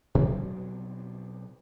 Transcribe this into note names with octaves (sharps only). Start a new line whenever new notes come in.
B2 F#3 G3 C4